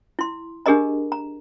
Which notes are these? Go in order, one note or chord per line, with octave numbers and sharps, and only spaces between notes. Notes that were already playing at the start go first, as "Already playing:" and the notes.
E4 C6
D4 G4 G#4 A#4 D#5 A#5
A#5